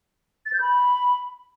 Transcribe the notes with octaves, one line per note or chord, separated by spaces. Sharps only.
A6
G6
B5